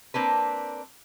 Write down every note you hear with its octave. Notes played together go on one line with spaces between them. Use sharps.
A#3 C4 D4 B4